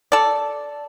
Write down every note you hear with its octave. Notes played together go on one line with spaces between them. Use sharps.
A4 D5